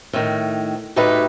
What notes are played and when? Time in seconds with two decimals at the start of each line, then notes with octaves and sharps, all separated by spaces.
0.13 A2 D#3
0.96 D2 A2 A3 D#4 G4 B4